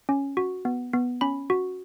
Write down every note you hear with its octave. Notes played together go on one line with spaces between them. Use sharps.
C#4
F#4
B3
B3
C#4 B5
F#4